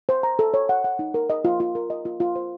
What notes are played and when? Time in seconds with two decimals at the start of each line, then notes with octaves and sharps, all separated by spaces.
0.09 C5
0.23 A#5
0.39 A4
0.54 C#5
0.69 F#5
0.84 F#5
0.99 D#4
1.14 A#4
1.30 D#5
1.45 F4
1.60 F4
1.75 A#4
1.90 D#5
2.05 F4
2.20 F4
2.36 C5